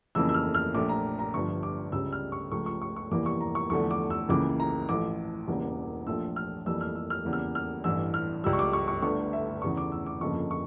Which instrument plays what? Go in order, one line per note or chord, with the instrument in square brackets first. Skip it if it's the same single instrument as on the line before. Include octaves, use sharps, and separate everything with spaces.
[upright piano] F2 C#3 E3 A#3 E6
E6
F6
F6
A#1 A#2 A3 D6
A#5
A#5
G1 G2 F3 C#6
D6
C#2 C#3 G3 E6
F6
C#6
C#2 C#3 F3 A3 C#6
C#6
C#6
C#6
F1 E2 E3 G3 A#3 D6
C#6
A#5
C#6
E2 D3 F3 A3 C#6
D6
E6
C#2 C#3 E3 A#3 D6
A#5
A1 A2 F3 A3 D6
E1 E2 C#3 G3 A#3
A#1 A#2 F3 A3 E6
F6
F2 E3 G3 A#3 E6
F6
E6
F6
E2 C#3 G3 A#3
F6
F6
A1 G2 E3 E6
F6
C#2 C#3 G3 E6
C#6
D6
C#6
C#6
G1 G2 D3 A3 C#6
E5
E2 C#3 E3 A3 C#6
D6
E6
D6
G1 F2 C#3 F3 A#3 C#6
C#6